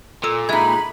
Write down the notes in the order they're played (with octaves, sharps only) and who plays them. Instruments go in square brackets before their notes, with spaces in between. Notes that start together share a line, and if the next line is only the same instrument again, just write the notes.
[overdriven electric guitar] A#2 [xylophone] A4 E6
[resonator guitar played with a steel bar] G#3 D#4 [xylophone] E5 G#6 [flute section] B5